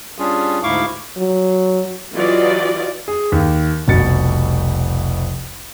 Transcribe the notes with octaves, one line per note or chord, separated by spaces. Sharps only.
G3 C#4 D4 F4 G#4
D2 G#2 E4 F5 C#6 D6
F#3
E3 F#3 F4 G4 D5 D#5
G#4
D#2
F1 C2 B2 A6 C#7